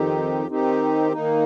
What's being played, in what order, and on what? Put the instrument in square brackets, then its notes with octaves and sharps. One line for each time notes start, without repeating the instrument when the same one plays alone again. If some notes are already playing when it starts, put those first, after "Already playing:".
Already playing: [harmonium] F2 D#3 C4 D#4 G4
D#3 C4 D#4 G4
D#3 A#3 D#4